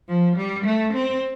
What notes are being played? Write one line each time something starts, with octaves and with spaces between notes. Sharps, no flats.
F3
G3
A3
C4